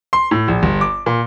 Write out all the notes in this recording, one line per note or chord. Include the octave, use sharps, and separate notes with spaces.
C6
A2
A#1
G1
D6
A#2